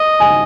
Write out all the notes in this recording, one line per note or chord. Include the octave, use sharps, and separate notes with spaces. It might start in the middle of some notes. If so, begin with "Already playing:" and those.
Already playing: D#5
G#5